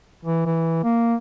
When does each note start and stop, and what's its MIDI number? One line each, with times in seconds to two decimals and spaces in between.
0.25 0.43 52
0.46 0.80 52
0.84 1.14 58